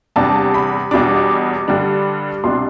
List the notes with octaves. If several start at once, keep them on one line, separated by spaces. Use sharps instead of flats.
E2 C3 G3 D4 A5
B5
E2 B2 G3 D4 D6
G2 D3 G3 D4
C2 B2 G3 D4 C6